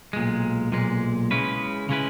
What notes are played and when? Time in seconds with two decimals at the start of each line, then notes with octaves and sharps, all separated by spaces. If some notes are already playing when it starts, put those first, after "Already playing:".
0.13 B1 A#2 G#3
0.72 B1 A#2 G#3
1.31 C#3 G#3 C#4 E4 B4
1.89 C#3 G#3 C#4 E4 B4